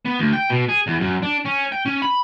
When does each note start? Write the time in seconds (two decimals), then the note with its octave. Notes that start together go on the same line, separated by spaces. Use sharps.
0.06 B3
0.19 D2
0.33 G5
0.50 B2
0.69 G#4
0.87 E2
1.00 F#2
1.23 D4
1.46 C#4
1.72 G5
1.86 C#4
2.02 B5